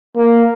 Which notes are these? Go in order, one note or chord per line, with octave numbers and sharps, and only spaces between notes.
A#3